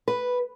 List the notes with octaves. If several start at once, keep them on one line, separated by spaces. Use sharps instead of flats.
B4